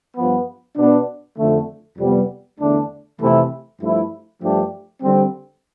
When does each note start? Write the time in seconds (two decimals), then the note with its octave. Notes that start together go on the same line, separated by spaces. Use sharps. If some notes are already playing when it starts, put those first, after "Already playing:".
0.16 G2 F3 B3
0.77 B2 B3 D4
1.37 F2 D3 A3
1.98 F2 C3 G3 B3
2.59 E2 D3 A3 D4
3.19 F2 C3 E3 A3 E4
3.80 G2 F3 A3 E4
4.40 G2 F3 A3 D4 G4
5.01 D3 G3 C4